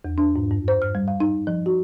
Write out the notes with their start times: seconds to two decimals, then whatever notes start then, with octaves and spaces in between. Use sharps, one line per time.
0.05 E2
0.18 D4
0.36 G#2
0.51 G2
0.68 C5
0.82 F6
0.95 G3
1.08 F5
1.20 D#4
1.47 F3
1.66 F#4